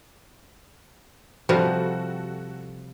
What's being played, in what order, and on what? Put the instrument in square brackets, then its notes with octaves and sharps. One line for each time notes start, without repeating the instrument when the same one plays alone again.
[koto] C3 F3 G3 [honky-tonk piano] F#4 A4